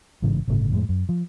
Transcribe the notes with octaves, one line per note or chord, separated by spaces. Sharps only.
A1 G#2 C#3 E3
G1 A2 C#3 A3
F2 A2 G#3
F#2
F3